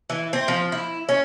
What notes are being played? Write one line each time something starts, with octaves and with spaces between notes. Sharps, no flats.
E3
C4
F3
E4
C#4